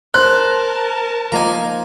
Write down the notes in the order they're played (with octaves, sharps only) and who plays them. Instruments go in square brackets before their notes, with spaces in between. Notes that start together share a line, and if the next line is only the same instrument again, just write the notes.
[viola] A#4 A5 [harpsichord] C5 [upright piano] F#6
[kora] F3 A#3 D#4 [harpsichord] G#5 A#5